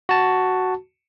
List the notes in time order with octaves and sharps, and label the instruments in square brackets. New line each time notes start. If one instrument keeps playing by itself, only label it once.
[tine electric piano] F#4 A5